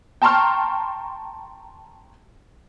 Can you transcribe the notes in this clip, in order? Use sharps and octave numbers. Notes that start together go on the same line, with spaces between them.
G5 A5 A#5 C6 C#6 F6